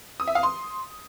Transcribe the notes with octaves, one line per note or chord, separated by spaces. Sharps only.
D#6
E5
F5
C6